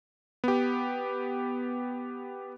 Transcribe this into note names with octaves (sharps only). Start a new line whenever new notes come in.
B3 G4